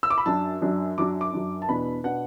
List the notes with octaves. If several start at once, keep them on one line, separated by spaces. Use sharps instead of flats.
E6
D6
B5
F#2 F#3 D4 A5
F#2 F#3 D4
F#2 F#3 D4 D6
D6
F#2 F#3 D4
A5
E2 B2 B3 D4 B5
B2 B3 D4 F#5